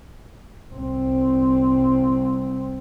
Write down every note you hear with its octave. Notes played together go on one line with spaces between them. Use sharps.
C2 C4